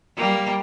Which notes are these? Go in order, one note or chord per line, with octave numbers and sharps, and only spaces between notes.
G3 A#3